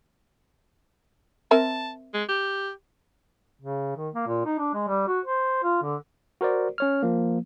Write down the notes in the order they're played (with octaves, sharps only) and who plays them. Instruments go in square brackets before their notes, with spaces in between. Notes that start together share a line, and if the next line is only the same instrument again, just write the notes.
[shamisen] C4 A#4 E5 [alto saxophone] A5
[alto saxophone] G#3
G4
[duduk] C#3
D#3
A#3
A#2
D#4
D4
G#3
G3
F#4
C5
F4
D3
[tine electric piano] F#4 A#4 C5 D5
C#4 C#5 F6
F3 A#3